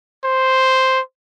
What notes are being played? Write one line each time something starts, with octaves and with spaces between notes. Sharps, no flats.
C5